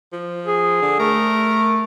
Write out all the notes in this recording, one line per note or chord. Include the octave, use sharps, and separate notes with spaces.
F3
G#4
D3
A3 A#4